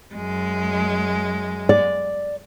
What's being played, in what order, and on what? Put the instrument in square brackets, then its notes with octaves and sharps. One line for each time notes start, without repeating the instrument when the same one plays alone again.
[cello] F#2 G#3
[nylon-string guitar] D5